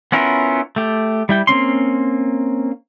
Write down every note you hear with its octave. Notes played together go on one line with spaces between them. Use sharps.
B3 C#4 E4 F4 A#4
A3 G4
G3 E4 G5
A#3 C4 C#4 C6